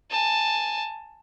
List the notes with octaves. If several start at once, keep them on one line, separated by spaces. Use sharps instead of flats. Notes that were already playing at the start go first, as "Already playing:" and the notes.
G#5 A5